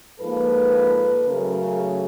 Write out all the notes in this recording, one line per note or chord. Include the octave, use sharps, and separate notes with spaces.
G#2 F3 A#3 A4 B4
C#3 F#3 A3 G#4 A#4